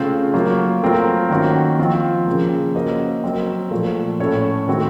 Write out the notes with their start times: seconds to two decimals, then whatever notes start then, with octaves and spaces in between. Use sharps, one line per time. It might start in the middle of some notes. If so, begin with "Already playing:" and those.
Already playing: C#3 A3 C4 F4 C5
0.34 F#3 A#3 F4
0.82 F#3 A3 C4 F4 A#4
1.30 D#3 A#3 C#4 F#4
1.79 F3 C4 F4
2.26 C#3 F3 A#3
2.75 A#3 C#4 F#4 C5 D#5
3.24 F#3 C4 F#4 A#4
3.71 A#2 F3 A3
4.19 A2 A3 C#4 A4 C#5
4.67 D#3 A3 C4 F#4